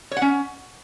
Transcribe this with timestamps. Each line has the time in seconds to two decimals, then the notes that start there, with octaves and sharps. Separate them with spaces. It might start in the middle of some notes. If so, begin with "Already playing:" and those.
0.11 C#5
0.17 F#5
0.22 C#4